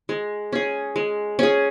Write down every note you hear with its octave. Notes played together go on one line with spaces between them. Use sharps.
G#3
C#4 G#4
G#3
C#4 G#4